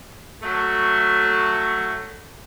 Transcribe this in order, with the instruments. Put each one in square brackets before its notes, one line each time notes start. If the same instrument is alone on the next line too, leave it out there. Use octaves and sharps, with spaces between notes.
[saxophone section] F#3 A3